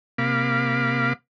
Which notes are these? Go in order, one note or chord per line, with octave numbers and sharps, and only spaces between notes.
C3 A#3 F5 B5 D6